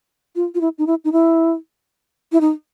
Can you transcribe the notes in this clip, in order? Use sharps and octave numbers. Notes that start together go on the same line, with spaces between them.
F4
F4
E4
D#4
E4
D#4
E4
E4
D#4